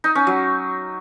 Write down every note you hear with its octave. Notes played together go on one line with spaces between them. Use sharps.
D#4
C#4
F#3